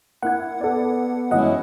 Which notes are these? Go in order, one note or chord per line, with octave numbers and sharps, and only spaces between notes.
A#3 E4 F#5 G#6
B3 A4 D5
F#2 E3 G#3 C#4 E4 D#5 F#5